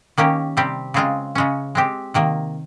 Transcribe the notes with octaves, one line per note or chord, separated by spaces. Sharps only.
D#3 A#3 C#4 G4
C3 G3 C4 G4
C#3 G#3 C4 F4 G#4
C#3 G#3 C#4
G#3 C4 G4
C3 D#3 A#3